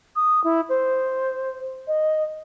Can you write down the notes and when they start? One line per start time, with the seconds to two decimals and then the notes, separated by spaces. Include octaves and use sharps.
0.16 D#6
0.44 E4
0.69 C5
1.88 D#5